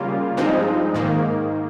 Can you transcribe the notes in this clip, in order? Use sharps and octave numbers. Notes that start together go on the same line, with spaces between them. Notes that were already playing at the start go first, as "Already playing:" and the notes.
Already playing: C#3 G3 A#3 F4
G2 F3 G#3 C4 D#4
G#2 D#3 A#3